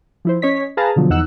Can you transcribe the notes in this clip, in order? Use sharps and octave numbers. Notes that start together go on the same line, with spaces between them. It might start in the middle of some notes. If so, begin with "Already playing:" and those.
F3 E4 C5
C#4 C#5 D#5 B6
G#4 B4 F5 A5 A#5
B2 D3 F3 F#3
E2 D#4 F#5 E6 F#6